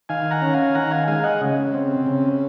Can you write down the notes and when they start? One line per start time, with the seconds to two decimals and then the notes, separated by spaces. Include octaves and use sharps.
0.09 D#3 F5 G#5
0.31 F#5 A#5
0.42 C#4
0.53 F5 G#5
0.75 D#3 F#5 A#5
0.91 F5 G#5
1.08 G#3 F5 G#5
1.24 D#5 F#5
1.41 C#3
1.74 C4
2.06 C#3